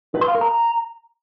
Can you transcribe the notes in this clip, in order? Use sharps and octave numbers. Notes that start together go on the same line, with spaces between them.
B4
C6
F5
A#4
A#5